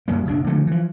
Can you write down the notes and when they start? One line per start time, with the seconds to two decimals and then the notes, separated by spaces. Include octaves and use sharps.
0.08 F#2 F#3 G3 A#3
0.26 F#1 B1 C#3 D4
0.47 D3 F3 F#3 A3
0.67 E3 F3